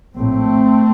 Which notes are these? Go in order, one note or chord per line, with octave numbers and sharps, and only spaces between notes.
A#1 A2 A3 C4